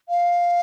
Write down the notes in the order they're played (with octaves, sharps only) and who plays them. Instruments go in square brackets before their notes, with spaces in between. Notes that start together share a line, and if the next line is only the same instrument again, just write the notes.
[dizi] F5